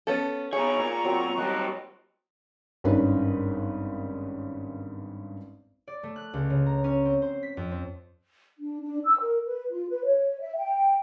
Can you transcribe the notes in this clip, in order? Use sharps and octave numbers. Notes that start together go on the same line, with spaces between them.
B3 C#4 A4
B2 G#4 C#5 A#5 C#6
A#2
F#3 C4 F#4
D#3 G3 D#4 F#4 A5 F#6
G#1 G2 C#4 D#4 B4
D5
A3
F#6
C#2
C#3
A#5
C#4
C4
C5
B6
F2
C4
D4
D4
E6
A#4
B4
F4
B4
C#5
E5
G5